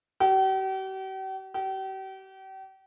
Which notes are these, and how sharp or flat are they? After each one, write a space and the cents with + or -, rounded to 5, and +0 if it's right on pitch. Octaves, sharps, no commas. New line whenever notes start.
G4 -45
G4 -40